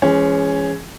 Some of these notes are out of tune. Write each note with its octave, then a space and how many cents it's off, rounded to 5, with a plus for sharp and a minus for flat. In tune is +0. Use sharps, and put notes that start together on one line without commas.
E3 +40 G#3 +0 C#4 +0